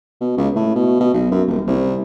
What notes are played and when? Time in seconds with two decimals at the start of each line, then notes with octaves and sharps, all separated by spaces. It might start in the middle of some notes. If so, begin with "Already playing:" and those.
0.21 B2
0.37 C#2
0.55 A2
0.75 B2
1.00 B2
1.14 B1
1.31 F#2
1.48 D#1
1.67 C2